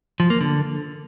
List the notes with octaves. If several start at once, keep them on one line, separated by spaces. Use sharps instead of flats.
F3
A#3
D3